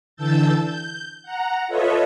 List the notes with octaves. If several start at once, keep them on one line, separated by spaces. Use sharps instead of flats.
D3 E3 A5 E6 G6 A6
G6
F#5 A#5
F4 A4 B4 C#5 D#5 E5